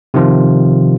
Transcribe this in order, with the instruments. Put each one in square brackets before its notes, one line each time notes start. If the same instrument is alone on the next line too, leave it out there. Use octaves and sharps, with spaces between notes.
[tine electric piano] C3 D#3 F3 F4